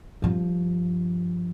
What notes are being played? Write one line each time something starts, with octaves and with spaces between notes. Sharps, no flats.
G2 F3